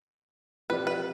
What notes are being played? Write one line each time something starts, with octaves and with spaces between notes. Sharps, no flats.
F3 C4 G4 B4 D5
B4